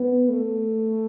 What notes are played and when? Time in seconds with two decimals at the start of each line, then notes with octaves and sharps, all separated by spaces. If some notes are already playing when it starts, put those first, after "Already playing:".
Already playing: B3
0.30 A3